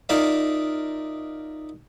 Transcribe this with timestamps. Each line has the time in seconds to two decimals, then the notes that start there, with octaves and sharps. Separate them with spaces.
0.09 D#4 F4 A#4 D5 E5 F5